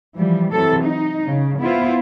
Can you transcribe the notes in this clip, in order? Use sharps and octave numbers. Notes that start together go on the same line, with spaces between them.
E3 F3 G3
C3 E3 F#3 A4
D#4
C#3
B3 E4 F4 C5